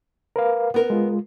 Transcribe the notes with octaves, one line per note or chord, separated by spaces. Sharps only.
A#4 B4 F5
B3 A#4
G#3 F4